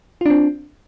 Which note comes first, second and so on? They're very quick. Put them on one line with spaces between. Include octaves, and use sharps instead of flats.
F4 D4 C4